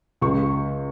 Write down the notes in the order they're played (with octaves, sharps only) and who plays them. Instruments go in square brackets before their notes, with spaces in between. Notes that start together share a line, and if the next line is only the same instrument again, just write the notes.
[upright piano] C#2 C#6